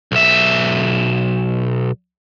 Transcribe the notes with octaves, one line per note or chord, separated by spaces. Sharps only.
B1 E5